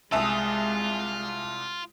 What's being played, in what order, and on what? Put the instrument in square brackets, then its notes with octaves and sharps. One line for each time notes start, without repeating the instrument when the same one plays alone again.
[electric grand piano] C2 A5 E6 [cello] G#3 [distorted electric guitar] F4 [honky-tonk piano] E5 G#5 D#6